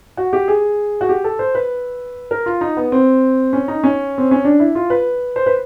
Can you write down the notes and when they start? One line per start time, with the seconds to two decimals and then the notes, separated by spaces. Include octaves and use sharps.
0.17 F#4
0.33 G4
0.48 G#4
1.01 F#4
1.09 G4
1.24 A4
1.39 C5
1.55 B4
2.31 A#4
2.46 F4
2.61 D#4
2.77 B3
2.92 C4
3.53 C#4
3.68 D#4
3.84 C#4
4.18 C4
4.31 C#4
4.45 D4
4.60 E4
4.75 F4
4.90 B4
5.36 C5
5.46 B4